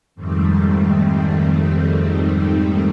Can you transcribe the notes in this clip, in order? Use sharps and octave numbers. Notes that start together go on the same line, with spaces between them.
F2 G#2 D#3 G3 A3 C4